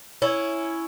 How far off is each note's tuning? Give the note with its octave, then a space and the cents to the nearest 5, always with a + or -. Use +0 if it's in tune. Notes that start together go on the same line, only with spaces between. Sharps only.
C#4 +0 E4 +0